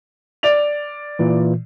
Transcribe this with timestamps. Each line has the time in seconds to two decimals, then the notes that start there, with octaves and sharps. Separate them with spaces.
0.43 D5 F7
1.19 A#2 E3